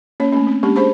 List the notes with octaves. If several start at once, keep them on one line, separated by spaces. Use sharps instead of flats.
A#3 C#4 C#5
A3 A#3 C#4
C4
G#3 A#3 C#4 D4 G4
D4 G#4 C5 A5 B5